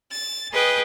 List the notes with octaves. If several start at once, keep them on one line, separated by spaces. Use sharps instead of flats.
A6
G#4 B4 D#5 G5